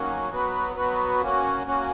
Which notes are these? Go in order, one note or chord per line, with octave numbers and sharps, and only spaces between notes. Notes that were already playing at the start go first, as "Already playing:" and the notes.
Already playing: D#3 F#3 A#3 C#4 F#4
F#3 B3 F#4 B4
F#3 B3 F#4 B4
A#3 C#4 F#4
A#3 C#4 F#4